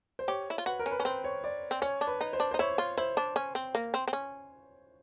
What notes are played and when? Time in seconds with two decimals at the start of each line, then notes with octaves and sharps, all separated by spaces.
0.19 C5
0.28 G4 C#5
0.50 E4
0.58 F4
0.66 F#4 B4
0.79 A#4
0.86 C#4
0.91 B4
1.00 C#4
1.05 C4 C5
1.24 C#5
1.44 D5
1.71 C4
1.82 C#4 C#5
2.01 D4
2.07 B4
2.21 D#4
2.33 C5
2.40 D4
2.51 D#4 C5
2.59 E4 C#5
2.78 F4
2.97 E4 C5
3.17 D4
3.36 C#4
3.55 C4
3.75 A#3
3.94 C4
4.08 C4
4.13 C#4